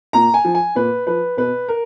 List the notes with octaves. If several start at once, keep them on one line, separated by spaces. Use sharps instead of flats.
A#2 A#5
G#5
F3
G#5
A#2 B4
F3 B4
B2 B4
A#4